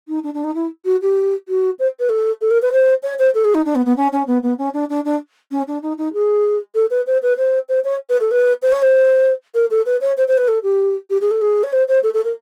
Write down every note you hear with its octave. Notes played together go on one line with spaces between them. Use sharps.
D#4
D4
D4
D#4
E4
F#4
G4
F#4
C5
B4
A4
A4
A#4
B4
C5
C#5
C5
A4
G#4
D#4
D4
B3
B3
C#4
C#4
B3
B3
C#4
D4
D4
D4
C#4
D4
D#4
D#4
G#4
A4
B4
C5
B4
C5
C5
C#5
B4
A4
B4
C5
C#5
C5
A#4
A4
B4
C#5
C5
C5
B4
A4
G4
G4
G#4
A4
G#4
C#5
C5
C5
A4
A4
A#4